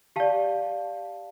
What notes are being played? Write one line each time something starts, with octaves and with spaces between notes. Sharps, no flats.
G4 D5 F5 A5